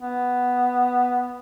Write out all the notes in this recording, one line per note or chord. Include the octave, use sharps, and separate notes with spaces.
B3